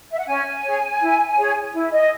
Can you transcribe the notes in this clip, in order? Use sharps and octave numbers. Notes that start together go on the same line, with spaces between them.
E5
F#5
C#4 G#5
G#4 C#5
E4
G#4 C#5
E4
D#5